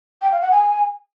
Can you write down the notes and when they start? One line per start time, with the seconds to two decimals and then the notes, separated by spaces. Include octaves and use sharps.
0.22 G5
0.32 F5
0.42 F#5
0.51 G#5